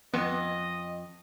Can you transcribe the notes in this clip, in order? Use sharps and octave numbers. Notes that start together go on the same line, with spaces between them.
F2 B3 D#5